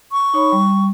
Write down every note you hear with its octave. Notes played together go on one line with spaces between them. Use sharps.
C#6
D#4 C#5 B5
G3